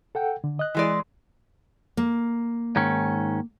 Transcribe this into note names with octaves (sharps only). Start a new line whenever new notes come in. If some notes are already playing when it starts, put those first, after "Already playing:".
A4 F#5 G5
D3
D#5 F#6
E3 G#3 D5
A#3
G#2 D#3 C#4